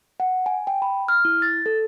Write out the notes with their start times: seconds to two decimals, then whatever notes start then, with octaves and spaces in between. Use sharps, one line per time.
0.20 F#5
0.46 G#5
0.67 G5
0.82 B5
1.08 F6
1.25 E4
1.42 A6
1.66 A4